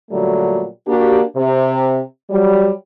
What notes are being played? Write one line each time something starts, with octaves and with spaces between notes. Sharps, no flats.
A#2 D3 F#3 G3 A3
A#3 D4 F#4 G4
C3
F#3 G3